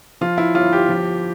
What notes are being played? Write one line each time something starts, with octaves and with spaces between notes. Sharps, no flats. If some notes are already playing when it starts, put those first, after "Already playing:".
F3 F4
E4
G1 F4
G4
F3